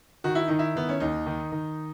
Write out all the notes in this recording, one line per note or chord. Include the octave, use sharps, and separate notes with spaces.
D#3 F#4
E4
D#3 D#4
E4
D#3 B3
C#4
D#2 D#4
D#3
D#3